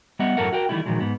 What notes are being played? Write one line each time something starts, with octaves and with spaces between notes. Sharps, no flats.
G3 B3 D#5 E5 F#5
F#2 A2 A4 A#4 E5 F#5
F#4 A#4 G5
D#3 E3 G3 A3 E4
A#2 D#3 F3 F#3 G#3
G#2 B3